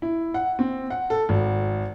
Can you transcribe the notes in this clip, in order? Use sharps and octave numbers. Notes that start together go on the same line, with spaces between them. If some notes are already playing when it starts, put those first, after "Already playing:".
E4
F#5
C4
F#5
A4
G#1